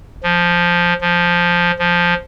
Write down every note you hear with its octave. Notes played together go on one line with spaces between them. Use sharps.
F3
F3
F3